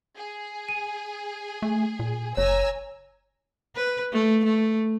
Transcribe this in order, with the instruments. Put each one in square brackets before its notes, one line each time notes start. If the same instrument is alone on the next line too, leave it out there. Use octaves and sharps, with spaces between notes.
[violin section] G#4
[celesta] D#7
[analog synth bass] A3
A#2
[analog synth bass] F#1 [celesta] C#5 [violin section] G#5 A#5 E6
[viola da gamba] B4
A3
A3